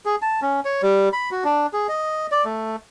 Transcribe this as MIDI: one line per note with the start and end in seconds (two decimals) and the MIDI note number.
0.06 0.16 68
0.22 0.40 81
0.42 0.60 61
0.65 0.82 73
0.82 1.09 55
1.13 1.30 83
1.31 1.44 66
1.44 1.67 62
1.73 1.87 68
1.89 2.27 75
2.32 2.44 74
2.45 2.76 57